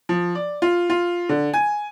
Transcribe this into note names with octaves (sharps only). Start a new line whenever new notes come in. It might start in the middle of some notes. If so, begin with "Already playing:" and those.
F3
D5
F4
F4
D3
G#5